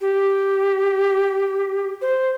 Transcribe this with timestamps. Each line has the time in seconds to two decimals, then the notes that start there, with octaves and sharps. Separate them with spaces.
0.01 G4
2.02 C5